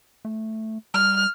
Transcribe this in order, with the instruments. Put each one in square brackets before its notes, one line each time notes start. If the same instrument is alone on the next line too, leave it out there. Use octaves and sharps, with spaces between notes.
[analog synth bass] A3
[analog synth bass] G3 [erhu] F6